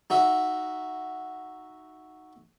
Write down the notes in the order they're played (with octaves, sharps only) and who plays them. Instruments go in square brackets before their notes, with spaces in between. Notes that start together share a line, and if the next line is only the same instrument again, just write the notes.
[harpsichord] D#4 F#4 E5